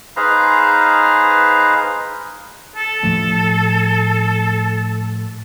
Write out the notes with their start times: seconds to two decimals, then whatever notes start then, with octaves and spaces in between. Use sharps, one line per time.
0.17 D#4 G#4 B4 C5 F5 A#5
2.75 A4
3.03 A2 F3 A3